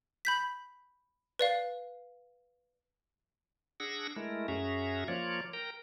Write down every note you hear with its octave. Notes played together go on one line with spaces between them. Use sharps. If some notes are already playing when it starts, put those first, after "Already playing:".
B5 G6 B6
B4 D5 F5
D4 G#4 F#5 E6 A#6
G#3 A3 E4 A#4
F#2 C#4 F#4 G#4 E5 A#5
F3 A#3 F4 C#5 D5
A#4 G5 A#5